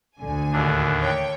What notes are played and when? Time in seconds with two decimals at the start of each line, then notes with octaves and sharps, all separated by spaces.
0.20 D2 D3 G#5
0.52 D#2 A2 D4
1.01 C#5 G5